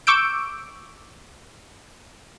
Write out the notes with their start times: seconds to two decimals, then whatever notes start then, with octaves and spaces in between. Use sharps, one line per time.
0.07 C#6 D6 E6 G6 D7